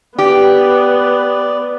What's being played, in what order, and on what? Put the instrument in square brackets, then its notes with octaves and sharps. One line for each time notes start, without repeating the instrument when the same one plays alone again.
[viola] B3 [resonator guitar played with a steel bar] G4 [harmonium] D5